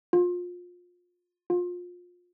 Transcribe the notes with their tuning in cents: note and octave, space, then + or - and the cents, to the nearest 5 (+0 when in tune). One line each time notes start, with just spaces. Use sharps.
F4 +25
F4 +25